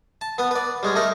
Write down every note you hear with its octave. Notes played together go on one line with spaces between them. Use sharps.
A5
B3 B4
B4 D5
G3 G#3 C#4
A3 D#4 A#4